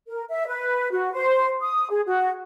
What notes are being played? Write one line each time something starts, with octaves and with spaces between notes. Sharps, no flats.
A#4
E5
B4
F#4
C5
D#6
G#4
F#4